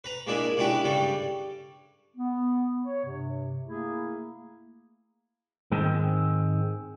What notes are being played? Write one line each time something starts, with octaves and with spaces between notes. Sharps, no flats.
B4 A#5
G#3 A#3 D4 E4 G#4
C#3 G#3 D4 E4 G4 B4
G2 C#3 G3 A4
B3
C#5
G2 C3
A3 A#3 E4 G#4
G#2 D#3 G#3 C4